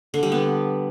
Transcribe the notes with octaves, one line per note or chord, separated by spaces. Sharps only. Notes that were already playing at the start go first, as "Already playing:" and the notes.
D3
G3
B3